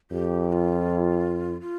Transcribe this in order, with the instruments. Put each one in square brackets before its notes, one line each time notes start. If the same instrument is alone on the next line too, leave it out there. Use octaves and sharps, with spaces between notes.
[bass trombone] F2 [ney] G4
[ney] G4
F4
F4